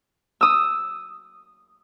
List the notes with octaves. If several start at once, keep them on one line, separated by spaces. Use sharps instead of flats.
D#6 E6